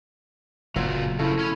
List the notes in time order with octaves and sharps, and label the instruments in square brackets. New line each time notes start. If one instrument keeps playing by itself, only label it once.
[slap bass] F#1 [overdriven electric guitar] A#2 F#3 [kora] F4 E5 F#5
[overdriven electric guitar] C#3 F3 [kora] A3 [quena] E4
[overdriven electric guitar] C#4 C#5